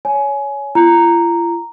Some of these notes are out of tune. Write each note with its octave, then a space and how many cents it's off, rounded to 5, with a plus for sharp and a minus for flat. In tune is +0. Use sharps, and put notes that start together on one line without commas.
C#5 +15 G#5 +20
F4 -45 A#5 -5